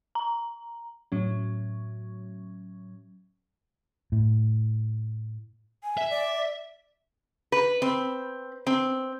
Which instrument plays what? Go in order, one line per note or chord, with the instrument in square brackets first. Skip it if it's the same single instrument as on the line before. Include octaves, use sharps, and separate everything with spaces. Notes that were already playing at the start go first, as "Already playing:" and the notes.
[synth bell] A#5
[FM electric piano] A2 F#3 C#4
[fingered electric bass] A2
[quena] G#5
[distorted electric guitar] E5
[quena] D5
[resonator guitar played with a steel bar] B4
C4
C4